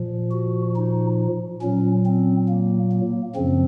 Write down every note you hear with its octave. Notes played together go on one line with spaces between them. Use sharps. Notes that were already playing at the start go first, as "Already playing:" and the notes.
Already playing: A#2 F3
F#4
D#4
A#2 F#3 C#4
C4
A#3
A#3
F#2 C#3 F3 C4